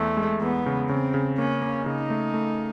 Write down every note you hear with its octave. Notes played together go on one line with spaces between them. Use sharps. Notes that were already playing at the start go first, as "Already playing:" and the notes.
Already playing: E2 A3
G#3
E2 B3
C#3
C#3 C4
C#3
A#3 C#4
A#3
C#3 D#4
A3
A3